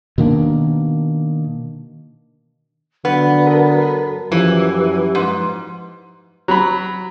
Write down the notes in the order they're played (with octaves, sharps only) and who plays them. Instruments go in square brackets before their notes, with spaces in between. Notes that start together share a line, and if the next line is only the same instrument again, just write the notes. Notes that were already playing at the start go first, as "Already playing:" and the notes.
[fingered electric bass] B2 D#3 A#3 D4
[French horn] D3 [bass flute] F#3 [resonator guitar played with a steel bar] B3
[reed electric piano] A4 A#4 B5
[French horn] F#2 [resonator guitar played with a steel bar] E3 [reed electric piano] F3 [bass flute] G4
[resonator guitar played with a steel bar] G#2 [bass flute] B4
[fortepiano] F#3 B5